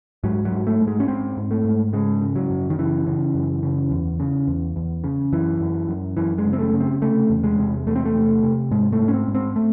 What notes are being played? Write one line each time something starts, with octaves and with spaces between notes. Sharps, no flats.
G#2 F#3
F#3
G#2
A3
G#2
G#3
C#4
G#2 C4
G#2
A3
G#2
C#3 G#3
C#3
F#3
F#2
D#3
C#3 E3
C#3
F#2
C#3
E2
C#3
E2
E2
C#3
F#2 E3
F#2
F#2
F#2 E3
G#3
C#3
C4
A3
C#3
C4
C3 A3
E2
G#3
C3
E2 A3
C4
A3
C3
C3
G#2 G#3
A3
G#2
C#4
C4
G#2
C4
A3